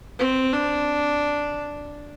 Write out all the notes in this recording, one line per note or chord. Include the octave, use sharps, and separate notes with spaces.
C4
D4